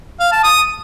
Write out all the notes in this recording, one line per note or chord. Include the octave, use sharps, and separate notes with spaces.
F5
A5
D#6